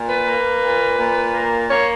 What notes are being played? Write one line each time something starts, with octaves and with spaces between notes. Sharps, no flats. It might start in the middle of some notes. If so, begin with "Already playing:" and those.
Already playing: A#2
B4
A#3
A#2
A#2
A#3
A#3 C#5